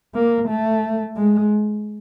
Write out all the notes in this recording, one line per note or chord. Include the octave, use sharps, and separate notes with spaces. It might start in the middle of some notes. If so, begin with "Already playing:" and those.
A#3
A3
G#3